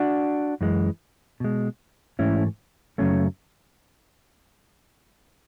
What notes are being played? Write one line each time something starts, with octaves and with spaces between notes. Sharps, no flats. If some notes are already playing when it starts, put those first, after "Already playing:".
Already playing: D4 F#4
F#2 E3 G#3
B2 G#3
G#2 E3 A3 C#4 E4
F#2 C#3 F#3 A3 C#4